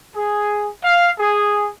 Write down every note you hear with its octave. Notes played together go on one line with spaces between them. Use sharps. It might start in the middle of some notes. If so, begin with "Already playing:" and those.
G#4
F5
G#4